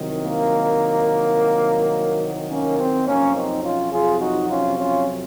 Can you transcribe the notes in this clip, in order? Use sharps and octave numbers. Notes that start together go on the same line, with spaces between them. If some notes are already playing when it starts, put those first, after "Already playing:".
Already playing: C2 C3 D#3 F#3
A#3
A#3 C#4
C4
F2 C3 F#3 A#3 C#4
C4 D#4
C#4 F4
F4 G#4
D#4 F#4
C#4 F4
C#4 F4